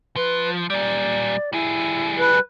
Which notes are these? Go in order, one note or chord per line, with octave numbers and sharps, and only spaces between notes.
F3 B4
A#2 G3 D5
G3 E4 G#4
B4